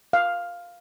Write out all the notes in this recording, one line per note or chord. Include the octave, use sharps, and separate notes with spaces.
F5